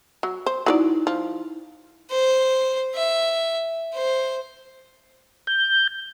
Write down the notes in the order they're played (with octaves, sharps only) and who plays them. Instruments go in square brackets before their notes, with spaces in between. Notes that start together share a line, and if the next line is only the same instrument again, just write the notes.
[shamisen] F#3
C5
[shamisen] F#3 B4 D5 [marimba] D#4 E4
[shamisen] F3
[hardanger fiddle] C5
E5
C5
[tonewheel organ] G6